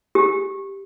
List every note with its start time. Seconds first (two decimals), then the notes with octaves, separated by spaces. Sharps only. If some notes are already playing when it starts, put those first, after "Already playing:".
0.15 G4